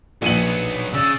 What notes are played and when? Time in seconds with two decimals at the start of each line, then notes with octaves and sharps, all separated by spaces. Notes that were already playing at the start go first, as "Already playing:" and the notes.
0.22 A#1 F#3 B3 D#7 F#7
0.94 C#3 D5 E6